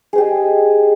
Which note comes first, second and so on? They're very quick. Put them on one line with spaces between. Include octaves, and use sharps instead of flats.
G#4 C5 G4 D#5